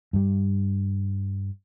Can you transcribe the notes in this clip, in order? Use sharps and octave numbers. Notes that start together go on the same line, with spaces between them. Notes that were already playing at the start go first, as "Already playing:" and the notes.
G2 G3